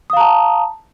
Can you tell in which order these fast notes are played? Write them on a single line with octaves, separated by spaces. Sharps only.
D#6 F5 A#5 A5